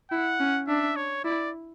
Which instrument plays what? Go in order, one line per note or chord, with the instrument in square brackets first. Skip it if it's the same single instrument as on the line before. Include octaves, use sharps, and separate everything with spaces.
[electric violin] E4 [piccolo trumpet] F#5
[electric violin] C#4
[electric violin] D4 [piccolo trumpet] E5
[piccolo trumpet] C#5
[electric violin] E4 [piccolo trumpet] D5